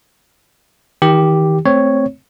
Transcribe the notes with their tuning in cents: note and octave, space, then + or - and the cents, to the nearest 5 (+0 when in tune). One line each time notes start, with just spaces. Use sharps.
D#3 +35 G4 +0
A3 +5 C4 +0 C#5 +0